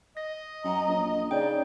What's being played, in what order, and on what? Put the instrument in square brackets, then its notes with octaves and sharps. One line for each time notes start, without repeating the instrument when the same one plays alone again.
[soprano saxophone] D#5 [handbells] A#6
[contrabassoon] F#2 [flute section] A#5
[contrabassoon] A#1
[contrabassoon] C#3 [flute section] D#4 D5 [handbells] G5 G6